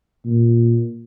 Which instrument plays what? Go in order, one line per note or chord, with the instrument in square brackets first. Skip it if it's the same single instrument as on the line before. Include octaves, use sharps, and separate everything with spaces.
[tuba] A#2